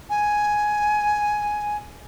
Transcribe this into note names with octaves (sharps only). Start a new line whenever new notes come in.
G#5